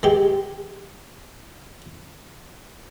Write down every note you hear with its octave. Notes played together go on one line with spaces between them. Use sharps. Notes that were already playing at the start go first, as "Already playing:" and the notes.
G#3 G4